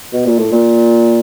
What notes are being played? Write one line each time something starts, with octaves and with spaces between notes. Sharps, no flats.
B2
A#2
A2
A#2